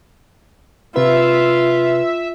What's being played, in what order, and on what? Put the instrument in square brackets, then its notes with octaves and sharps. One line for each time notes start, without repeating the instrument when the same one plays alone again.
[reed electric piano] C3 B4 [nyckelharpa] F4 [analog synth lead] E5